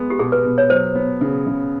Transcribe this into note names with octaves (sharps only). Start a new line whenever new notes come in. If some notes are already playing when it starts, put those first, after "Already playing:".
Already playing: G#3 B3
G4
B2 G#4
B4
B2
C#5
F#3 C5
B3
C#3
C#3